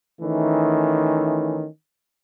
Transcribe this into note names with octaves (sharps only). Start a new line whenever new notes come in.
D#3 E3 A3 C#4 D#4